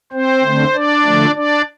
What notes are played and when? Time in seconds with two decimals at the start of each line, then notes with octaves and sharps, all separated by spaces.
0.13 C4 C5
0.43 D3 A3 C4
0.73 D4 D5
1.04 D3 F3 A3
1.35 D4 D5